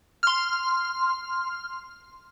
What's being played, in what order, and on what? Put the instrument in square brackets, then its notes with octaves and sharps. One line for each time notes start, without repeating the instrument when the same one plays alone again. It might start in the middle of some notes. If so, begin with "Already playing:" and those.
[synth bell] C6 F6